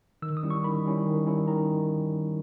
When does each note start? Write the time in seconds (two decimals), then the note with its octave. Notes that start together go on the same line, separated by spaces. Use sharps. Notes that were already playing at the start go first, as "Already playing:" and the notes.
0.22 D#3 E6
0.37 D#6
0.43 G3 C#4 E4
0.50 C#6
0.64 D#3 B5
0.85 G3 C#4 E4
1.06 D#3
1.27 G3 C#4 E4
1.48 D#3 A#5